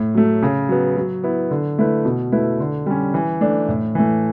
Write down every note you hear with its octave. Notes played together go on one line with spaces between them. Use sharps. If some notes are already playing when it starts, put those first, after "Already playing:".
Already playing: A2
F#3 A3
C#3
F#3 B3
F#3
B3 E4
D3
A3 E4 B4
B2
A3 E4 B4
D3
G3 C#4
E3
A3 D4
A2
E3 A3